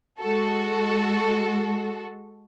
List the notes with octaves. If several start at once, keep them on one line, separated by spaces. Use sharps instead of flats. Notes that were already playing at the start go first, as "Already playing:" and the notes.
G#3 F#4 A4